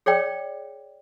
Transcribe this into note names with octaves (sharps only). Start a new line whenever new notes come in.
G#4 C#5 D5 G5